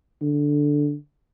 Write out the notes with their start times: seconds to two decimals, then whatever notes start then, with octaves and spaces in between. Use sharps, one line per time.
0.21 D3